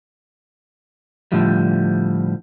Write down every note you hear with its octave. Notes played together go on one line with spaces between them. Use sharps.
A2 D3 F3 G3